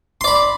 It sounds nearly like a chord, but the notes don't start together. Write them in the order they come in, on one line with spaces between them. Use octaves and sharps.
C6 D5 B5